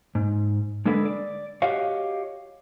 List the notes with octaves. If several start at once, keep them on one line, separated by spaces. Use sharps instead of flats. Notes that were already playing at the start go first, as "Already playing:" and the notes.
G#2
D3 G#3 D4 A4 B4
D5
F#4 G4 C#5 D#5 F5